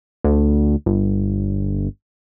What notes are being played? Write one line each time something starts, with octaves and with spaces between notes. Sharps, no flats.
D2
G1